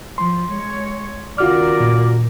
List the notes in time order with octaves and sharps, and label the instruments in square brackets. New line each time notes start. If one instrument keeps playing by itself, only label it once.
[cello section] F3 [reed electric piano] C6
[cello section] G#3 C#5
[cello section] D#2 C#3 A#4 [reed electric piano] F4 F#4 F6 [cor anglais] D5
[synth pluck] A#2